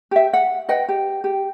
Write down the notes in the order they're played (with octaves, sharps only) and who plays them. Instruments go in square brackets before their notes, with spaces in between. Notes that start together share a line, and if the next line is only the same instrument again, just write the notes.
[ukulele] G4 E5
F#5
B4 D#5 F#5 G5
G4
G4